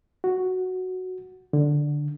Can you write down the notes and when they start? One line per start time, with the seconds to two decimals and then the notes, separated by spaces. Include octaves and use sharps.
0.24 F#4
1.53 D3